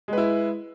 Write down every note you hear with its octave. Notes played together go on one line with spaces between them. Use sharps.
G#3 E4 B4